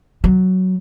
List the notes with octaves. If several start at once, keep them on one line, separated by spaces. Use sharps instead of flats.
F#3